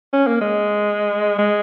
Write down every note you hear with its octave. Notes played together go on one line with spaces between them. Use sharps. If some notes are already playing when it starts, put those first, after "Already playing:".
C#4
A#3
G#3
G#3